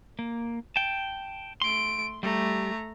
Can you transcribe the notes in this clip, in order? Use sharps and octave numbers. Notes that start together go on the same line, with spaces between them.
A#3
G5 A5
A3 C6 D7
G3 A3 A#5